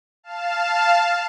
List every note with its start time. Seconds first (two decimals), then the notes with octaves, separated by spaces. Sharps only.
0.23 F5 A5